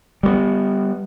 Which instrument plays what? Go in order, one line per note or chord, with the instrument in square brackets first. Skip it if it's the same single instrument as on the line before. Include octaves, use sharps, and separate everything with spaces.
[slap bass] G3 G#3 B3